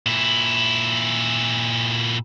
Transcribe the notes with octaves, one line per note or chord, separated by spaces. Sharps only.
A#2 E4